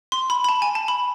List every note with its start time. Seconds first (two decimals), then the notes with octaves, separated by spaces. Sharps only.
0.12 C6
0.30 B5
0.44 B5
0.49 A5
0.62 G#5
0.75 A5
0.88 B5